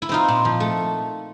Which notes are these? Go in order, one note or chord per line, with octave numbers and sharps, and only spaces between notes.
E4
C4 D#4 F4
A#2
F3
A3